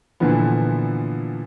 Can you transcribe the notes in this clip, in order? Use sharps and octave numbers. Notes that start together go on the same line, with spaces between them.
A#2 D3 E3 F3 B3